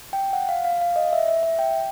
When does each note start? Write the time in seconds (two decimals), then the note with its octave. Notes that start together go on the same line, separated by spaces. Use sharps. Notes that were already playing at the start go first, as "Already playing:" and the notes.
0.13 G5
0.33 F#5
0.49 F5
0.64 F5
0.81 F5
0.96 D#5
1.13 E5
1.28 E5
1.43 E5
1.59 G5